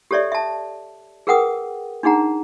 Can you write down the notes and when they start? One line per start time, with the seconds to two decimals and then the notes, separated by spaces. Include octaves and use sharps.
0.11 G4 A4 C#5 D5 E5
0.32 E5 A5
1.27 G#4 A#4 B4 F#5 G5 D#6
2.03 D4 D#4 G#4 F#5 A#5